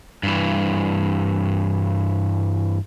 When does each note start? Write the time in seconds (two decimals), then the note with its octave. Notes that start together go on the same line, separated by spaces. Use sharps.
0.23 G2 E3